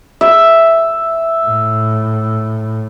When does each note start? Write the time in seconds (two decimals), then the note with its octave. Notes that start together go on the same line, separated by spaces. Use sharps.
0.21 E5
1.47 A2